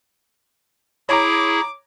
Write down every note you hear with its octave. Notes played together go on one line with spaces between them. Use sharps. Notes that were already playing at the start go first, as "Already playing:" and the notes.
E4 G#4 C#5 A#5 D6